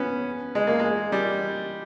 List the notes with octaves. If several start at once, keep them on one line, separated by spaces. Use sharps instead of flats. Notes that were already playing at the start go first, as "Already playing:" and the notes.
Already playing: B3 C#4
G#3
A#3
G#3
G3